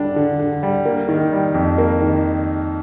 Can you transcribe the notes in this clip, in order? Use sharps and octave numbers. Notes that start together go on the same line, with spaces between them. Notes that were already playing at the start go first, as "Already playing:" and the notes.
Already playing: D3 G3 D4
D3
D3
G3
A#3
D#3
G3
F2
A#3
D#3